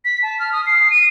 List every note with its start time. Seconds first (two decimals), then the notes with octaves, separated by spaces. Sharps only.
0.05 B6
0.23 A5
0.39 F6
0.53 D#6
0.66 C7
0.91 D#7